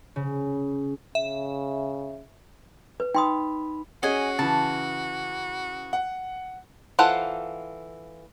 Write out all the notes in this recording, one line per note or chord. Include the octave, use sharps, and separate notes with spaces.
C#3
C#3 E5
B4
D#4 G5 B5 C6 D#6
C#4 F#4 G#4 D#5 G#5
C#3 E3 A5
F#5
E3 F4 A4 C5 F#5